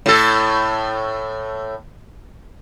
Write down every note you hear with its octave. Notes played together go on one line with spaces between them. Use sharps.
A2 A4